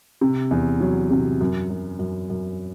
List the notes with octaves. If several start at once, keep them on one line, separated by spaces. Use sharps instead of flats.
C3
E2
F#3
C3
F#2
F#2
F#2
F#2